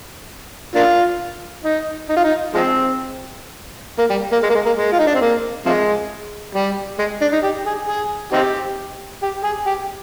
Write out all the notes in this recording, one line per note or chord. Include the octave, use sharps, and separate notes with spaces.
A#3 D4 F4
D#4
D#4
F4
D#4
F3 G#3 C4
A#3
G3
A#3
G#3
A#3
G#3
A#3
G#3
F4
D#4
D4
C4
A#3
C3 F3 G#3
G3
G#3
D4
D#4
G4
G#4
G#4
C4 D#4 G4
G4
G#4
G4